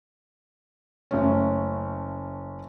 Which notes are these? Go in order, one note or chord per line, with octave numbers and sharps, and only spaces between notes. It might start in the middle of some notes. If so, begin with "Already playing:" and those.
F#1 A3 C#4